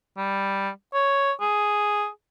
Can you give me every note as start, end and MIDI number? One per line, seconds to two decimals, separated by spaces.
0.17 0.69 55
0.94 1.32 73
1.41 2.08 68